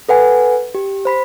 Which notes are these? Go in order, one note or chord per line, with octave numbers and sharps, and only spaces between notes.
A4 B4 F#5 G#5
G4
C5 B5 B6